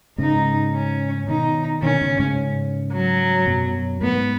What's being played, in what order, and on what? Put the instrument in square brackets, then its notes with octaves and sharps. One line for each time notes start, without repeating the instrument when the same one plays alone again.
[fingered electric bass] G#2 C#3 [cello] D#4
[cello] C#4
[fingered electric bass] B2 D#3 [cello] D#4
[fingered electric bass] B2 D#3 [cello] C#4
[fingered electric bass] G#2 C#3
G#2 C#3
[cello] F#3
[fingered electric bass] F#2 B2
[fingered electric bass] G#2 [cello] B3